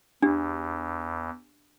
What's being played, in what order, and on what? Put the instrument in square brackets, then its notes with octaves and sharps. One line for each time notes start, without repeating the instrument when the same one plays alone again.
[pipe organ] E2 [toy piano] D4 G4